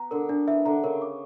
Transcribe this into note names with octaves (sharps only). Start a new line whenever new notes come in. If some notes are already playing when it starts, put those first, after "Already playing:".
Already playing: B3 A#5
D3 A#4
D3 D4
E3 E5
D3 A#5
C#3 A#4
D6